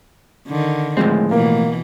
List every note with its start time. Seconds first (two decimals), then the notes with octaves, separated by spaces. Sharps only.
0.48 D3 D#3
0.97 A2 F3 G#3 C4
1.31 B2 E3 A#3